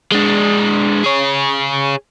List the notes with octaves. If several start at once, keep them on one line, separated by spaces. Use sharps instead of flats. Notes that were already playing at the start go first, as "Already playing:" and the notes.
G#3 D4
G#4 C#5